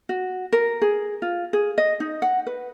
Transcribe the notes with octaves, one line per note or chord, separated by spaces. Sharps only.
F#4
A#4
G#4
F4
G#4
D#5
D#4
F#5
B4